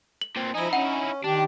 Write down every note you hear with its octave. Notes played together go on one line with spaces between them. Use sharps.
F#7
A#2 C4
F3 D#4 E4 D#5 G#5
C#4 F#5
D#3 D4 G4